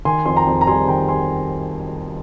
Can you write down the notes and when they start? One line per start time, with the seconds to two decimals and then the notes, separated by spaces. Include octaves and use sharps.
0.05 D#3 G#5 C6
0.26 F2 C6
0.36 G5 A#5
0.47 F2
0.61 A#5
0.67 G3 G#5 C6
0.88 D#3 G5 A#5
1.09 G#5 C6